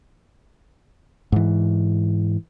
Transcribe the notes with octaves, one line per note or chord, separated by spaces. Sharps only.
G#2 E3